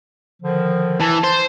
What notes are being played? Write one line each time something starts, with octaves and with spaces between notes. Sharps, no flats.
D3 D#3 F3
E3 A5
C5